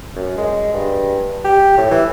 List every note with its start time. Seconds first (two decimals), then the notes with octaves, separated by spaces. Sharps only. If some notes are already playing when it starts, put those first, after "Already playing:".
0.16 F#2
0.38 G#3
0.74 G2
1.44 G4
1.78 A2
1.91 E3